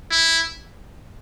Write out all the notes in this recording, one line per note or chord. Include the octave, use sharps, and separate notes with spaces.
E4